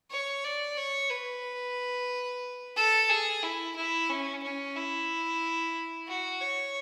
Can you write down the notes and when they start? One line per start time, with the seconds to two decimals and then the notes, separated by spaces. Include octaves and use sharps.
0.11 C#5
0.45 D5
0.77 C#5
1.10 B4
2.76 A4
3.10 G#4
3.43 E4
3.76 E4
4.09 C#4
4.43 C#4
4.76 E4
6.08 F#4
6.41 C#5